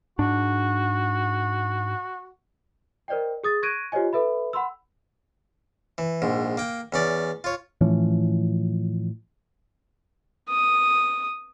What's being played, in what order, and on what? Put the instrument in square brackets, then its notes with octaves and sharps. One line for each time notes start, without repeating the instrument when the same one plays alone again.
[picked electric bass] G#2 D4 [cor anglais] F#4
[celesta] A#4 C5 D5 D#5 G5
G#4 D#6 A6
C#6 F#6 G#6 A#6 D7 D#7
F4 G4 C5 C#5 D#5 G#5
A4 B4 E5 B5
F#5 B5 C6 E6
[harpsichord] E3
A#1 G#2
A#3 G5
E2 C#4 D5
F4 C#5
[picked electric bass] A2 E3 F3 C#4
[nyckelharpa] D#6